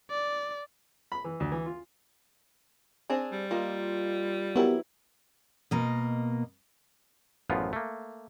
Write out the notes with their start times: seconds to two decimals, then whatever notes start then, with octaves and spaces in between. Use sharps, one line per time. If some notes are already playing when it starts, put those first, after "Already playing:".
0.10 D5
1.12 B5
1.24 E3
1.40 D2
1.52 E3
1.66 F4
3.10 C4 D4 G#4
3.32 G3
3.51 A#3 F4 D#5
4.56 F#3 B3 E4 G4 A#4 B4
5.71 B2 A#3 D#5
7.50 A1 F#2 F3 B3 F4
7.73 A3 A#3